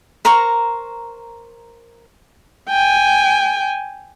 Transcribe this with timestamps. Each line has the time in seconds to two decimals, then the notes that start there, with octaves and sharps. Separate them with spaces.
0.25 A#4 C5 A#5 C#6
2.70 G5 G#5